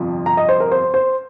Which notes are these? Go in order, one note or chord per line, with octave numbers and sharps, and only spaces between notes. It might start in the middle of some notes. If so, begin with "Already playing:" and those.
Already playing: G1 F2 C3 F3
A#5
D#5
C5
A#4
C5
C5